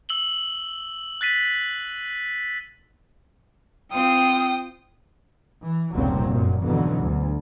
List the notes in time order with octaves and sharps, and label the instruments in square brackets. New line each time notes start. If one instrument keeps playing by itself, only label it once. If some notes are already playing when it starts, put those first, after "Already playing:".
[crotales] E6 F#7 G7
F#6 A6 B6 D#7
[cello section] C4 F4 [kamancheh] G5 D#6
[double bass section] E3
F1 C#2 A#2 F#3 G3 C4
F#2 A#2 F3
F2 G#2 B2 D3 E3 F#3
D2